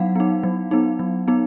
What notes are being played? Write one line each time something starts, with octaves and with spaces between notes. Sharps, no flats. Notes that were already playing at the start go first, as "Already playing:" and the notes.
Already playing: F#3 B3 D#4 F5 F#5
B3 D#4
F#3
B3 D#4
F#3
B3 D#4